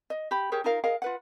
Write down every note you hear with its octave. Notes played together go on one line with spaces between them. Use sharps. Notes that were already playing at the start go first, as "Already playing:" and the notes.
D#5
G4 B5
G4 G#4 A#4 C#5
D#4 F4 A#4 F5
G#4 A#4 D#5 F5
F4 B4 F#5